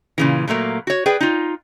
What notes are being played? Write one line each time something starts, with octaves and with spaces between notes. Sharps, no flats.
A#2 C#3 E3
A#2 F#3 A3 A#3
F#4 C#5
G#4 B4 D5 G5
D#4 F4